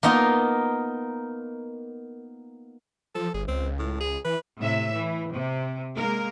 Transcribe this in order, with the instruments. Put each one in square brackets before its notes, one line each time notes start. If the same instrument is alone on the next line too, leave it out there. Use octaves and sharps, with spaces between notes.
[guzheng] A#3 B3 D#4 F4 A#4
[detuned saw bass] F3 [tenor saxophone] A4
[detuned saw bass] G1 [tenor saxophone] G#4
[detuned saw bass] C#2 [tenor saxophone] C4
[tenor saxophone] A2
G#4
[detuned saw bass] E3 [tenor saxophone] B4
[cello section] A2 C3 E5
E3
C3
G#3 A#3 A#4